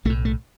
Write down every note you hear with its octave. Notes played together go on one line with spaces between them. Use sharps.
B1 A2 A3
A3